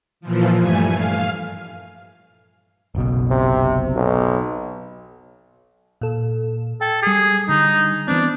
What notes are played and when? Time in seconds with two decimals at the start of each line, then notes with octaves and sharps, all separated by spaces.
0.21 A#2 E3 F3
0.58 G2 A3 G#5
0.92 F5
2.95 F#1 B1 B2
3.31 C3
3.96 B1
6.01 A#2 A4
6.81 A4 G5 G#6
7.03 G3 G#4 C7
7.49 D3 G3 D#4
8.08 E3 B3 C4 D4